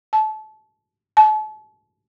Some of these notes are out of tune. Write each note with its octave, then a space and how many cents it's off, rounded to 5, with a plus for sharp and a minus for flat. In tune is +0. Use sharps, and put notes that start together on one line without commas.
A5 -25
A5 -40